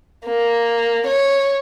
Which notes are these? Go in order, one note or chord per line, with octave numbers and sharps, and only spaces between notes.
A#3
C#5